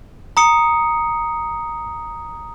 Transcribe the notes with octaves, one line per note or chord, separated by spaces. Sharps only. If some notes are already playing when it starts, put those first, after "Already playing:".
A#5 D#6 C#7